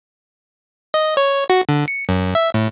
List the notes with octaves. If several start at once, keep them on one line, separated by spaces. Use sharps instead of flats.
D#5
C#5
F#4
D3
C#7
F#2
E5
A2